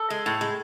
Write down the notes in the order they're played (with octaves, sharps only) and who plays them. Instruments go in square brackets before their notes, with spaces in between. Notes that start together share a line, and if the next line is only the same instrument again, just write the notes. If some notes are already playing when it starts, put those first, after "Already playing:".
Already playing: [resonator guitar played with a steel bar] A4
G#3
A2
G#3